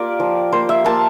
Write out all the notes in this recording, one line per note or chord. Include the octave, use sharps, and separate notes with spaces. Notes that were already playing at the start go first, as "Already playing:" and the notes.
Already playing: A#3 F4 G4 A#4 D5
F3
A#3 C5
E5
A#3 A5